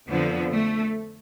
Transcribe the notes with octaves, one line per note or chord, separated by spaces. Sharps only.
F2 D3 F3 B3
A3